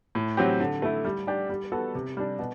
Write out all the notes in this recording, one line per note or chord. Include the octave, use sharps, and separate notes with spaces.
A2
F#3 C4 G4
D3
A3 E4
G3
D4 G4
G3
B3 F#4 A4
C3
G3 D4
B2